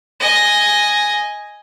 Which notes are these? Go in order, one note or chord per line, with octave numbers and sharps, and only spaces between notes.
D#5 G#5